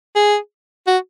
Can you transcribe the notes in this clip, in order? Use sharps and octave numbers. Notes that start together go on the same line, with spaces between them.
G#4
F#4